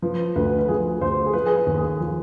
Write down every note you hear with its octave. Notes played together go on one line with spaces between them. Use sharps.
F3 B4
D2 B4
B4
F3 G#4
D2 C5
G#4
F3 B4
G#4
B4
D#2
G#4
F3